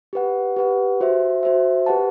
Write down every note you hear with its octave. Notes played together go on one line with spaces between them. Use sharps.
G4 B4 F#5
G4 B4 F#5
F#4 C5 E5
F#4 C5 E5
G4 B4 F#5 A5